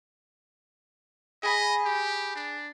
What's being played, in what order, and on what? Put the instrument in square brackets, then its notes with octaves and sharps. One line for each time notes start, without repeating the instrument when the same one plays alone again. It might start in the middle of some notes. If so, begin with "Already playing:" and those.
[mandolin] G#4 B5 [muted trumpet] D#5
[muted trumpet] G4
D4